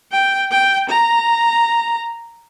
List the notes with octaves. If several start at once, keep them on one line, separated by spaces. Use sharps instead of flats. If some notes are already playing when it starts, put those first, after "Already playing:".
G5
G5
A#5